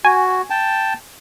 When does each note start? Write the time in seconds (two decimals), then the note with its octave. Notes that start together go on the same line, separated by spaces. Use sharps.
0.05 F#4 G#5
0.50 G5 A5